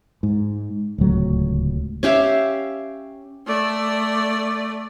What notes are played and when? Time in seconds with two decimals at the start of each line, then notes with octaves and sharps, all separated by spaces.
0.23 G#2
0.98 D1 C#2 F#3 A3
2.03 C#4 G4 E5 F5
3.47 A3 D5